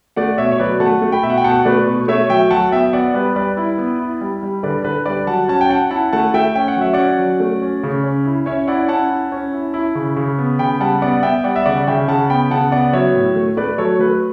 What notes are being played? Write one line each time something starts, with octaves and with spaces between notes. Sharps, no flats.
A3 D5 F#5
B2 C#5 E5
C#5
F#3 B4 D5
A3 F#5 A5
A3
G5 B5
B2 E5
F#5
G5
B2 F#5 A5
A3 B4 D5
B2 B4
A3 C#5 E5
F#3 E5 G5
F#3 F#5 A5
B3 E5 G5
B3 D5 F#5
G3 B4 D5
G3 B4 D5
E4
B3
E4
G3
G3
D3 B4 D5
D3 B4
G3 B4 D5
F#3 F#5 A5
C#4 F#5 A5
G5
C#4 F#5 A5
E4 F#5 A5
A3 F#5 A5
A3 E5 G5
C#4 G5
F#5
F#3 E5
C#4 D5 F#5
F#3
A3
C#4
C#3
C#4
E4
C#4 C#5 E5
E4 D5 F#5
C#4 F#5 A5
E4
C#4
E4
E4
C#3
C#3
B3
C#3 G5 B5
G3 F#5 A5
B3 D5 F#5
B3 E5 G5
G3 D5 F#5
E5
C#3 D5 F#5
C#3 E5 G5
C#3 F#5 A5
B3 G5 B5
C#3 F#5 A5
B3 D5 F#5
F#3 C#5 E5
A2
A3
A3 B4 D5
F#3 A4 C#5
A3 B4